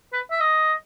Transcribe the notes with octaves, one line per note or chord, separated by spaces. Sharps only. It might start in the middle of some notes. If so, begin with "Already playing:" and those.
B4
E5
D#5